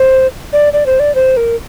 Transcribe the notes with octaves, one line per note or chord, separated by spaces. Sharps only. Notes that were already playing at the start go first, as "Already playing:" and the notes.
Already playing: C5
D5
D5
C5
D5
C5
A#4